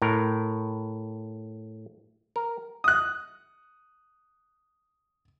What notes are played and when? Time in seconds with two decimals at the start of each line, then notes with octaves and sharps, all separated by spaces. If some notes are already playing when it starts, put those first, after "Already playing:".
0.02 A2 A#4
2.36 A#4
2.84 D#6 F#6